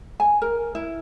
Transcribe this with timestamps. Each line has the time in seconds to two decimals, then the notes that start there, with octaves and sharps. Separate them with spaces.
0.20 G#5
0.42 A#4
0.75 E4